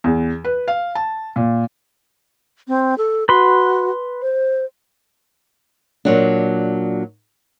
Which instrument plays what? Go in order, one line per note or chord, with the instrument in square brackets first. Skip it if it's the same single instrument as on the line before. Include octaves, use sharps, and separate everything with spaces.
[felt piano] E2
B4
F5
A5
A#2
[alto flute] C4
A4
[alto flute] F#4 [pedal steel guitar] B4 C6
[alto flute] C5
[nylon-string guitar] A#2 F#3 D4